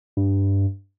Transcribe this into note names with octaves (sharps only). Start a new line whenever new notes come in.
G2